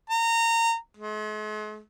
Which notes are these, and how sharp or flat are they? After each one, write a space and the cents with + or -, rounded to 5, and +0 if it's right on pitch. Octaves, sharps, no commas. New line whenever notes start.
A#5 -25
G#3 +45